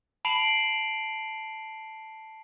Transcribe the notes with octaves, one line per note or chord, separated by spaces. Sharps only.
A5 B5 C7 D7 F7 F#7